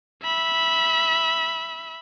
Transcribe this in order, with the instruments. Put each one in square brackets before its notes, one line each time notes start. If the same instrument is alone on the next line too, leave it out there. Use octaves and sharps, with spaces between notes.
[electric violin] E5 B5